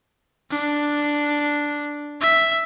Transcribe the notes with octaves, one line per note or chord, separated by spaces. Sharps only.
D4
E5